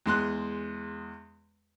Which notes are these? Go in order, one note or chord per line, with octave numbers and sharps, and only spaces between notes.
E2 G#3 C6 F#6